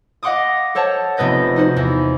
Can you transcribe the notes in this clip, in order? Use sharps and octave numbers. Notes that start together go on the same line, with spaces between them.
D#5 F5 F#5 C6 D6 D#6
A4 C5 C#5 F#5 A5
F1 C3 B3 B4 D#5 G6
D#4 F#4 C5
E2